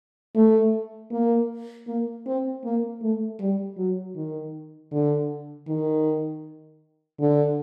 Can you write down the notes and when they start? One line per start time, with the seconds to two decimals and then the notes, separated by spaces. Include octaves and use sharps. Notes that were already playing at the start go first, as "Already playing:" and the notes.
0.36 A3
1.11 A#3
1.87 A#3
2.26 C4
2.64 A#3
3.02 A3
3.40 G3
3.78 F#3
4.16 D#3
4.92 D3
5.68 D#3
7.20 D3